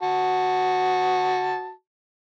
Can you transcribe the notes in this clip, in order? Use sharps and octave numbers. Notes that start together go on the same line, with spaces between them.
F#4 A5